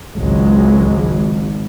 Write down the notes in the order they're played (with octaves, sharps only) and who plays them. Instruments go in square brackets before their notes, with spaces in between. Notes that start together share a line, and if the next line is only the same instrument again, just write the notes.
[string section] G#1 [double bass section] C#2 F#3 G#3